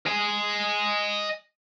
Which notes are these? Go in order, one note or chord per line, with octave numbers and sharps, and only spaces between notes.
D#5 G#5